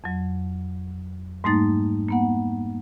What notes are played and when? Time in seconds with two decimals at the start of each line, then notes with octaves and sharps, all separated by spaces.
0.04 F2 F#3
1.44 G#2 G3 A3 A#3 D#4 A6
2.09 A#3 B3 F#5